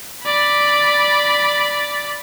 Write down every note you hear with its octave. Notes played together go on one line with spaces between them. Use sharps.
D5 B5